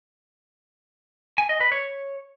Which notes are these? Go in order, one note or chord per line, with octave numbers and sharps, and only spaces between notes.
G#5
D#5
B4
C#5